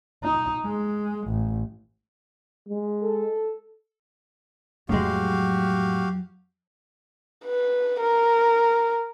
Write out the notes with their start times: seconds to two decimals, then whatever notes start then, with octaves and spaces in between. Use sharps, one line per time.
0.24 D#4
0.66 G#3
1.28 A1
2.69 G#3
3.02 A4
4.89 F2 A2 F#3 G#3 F#4 G4 F5
7.45 B4
8.01 A#4